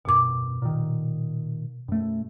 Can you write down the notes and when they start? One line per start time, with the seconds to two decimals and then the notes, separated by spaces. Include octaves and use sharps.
0.05 D#1 F#2 B2 D6
0.62 A#2 D#3
1.88 F#2 A3